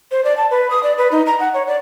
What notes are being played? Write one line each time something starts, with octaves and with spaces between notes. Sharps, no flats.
C5
D5
A5
B4
D#6
D5
B4
D#4
A#5
F#5
C#5
D5